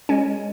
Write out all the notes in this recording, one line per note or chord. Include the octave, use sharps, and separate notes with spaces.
G#3 C#4